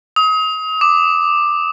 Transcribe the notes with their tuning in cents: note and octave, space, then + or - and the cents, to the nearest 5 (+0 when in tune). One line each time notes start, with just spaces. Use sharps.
D#6 +35
D6 +15